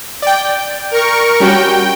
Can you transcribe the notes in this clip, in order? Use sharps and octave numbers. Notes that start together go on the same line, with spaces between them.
D5 G5
A#4 C#6
G3 C#4 F#4 G5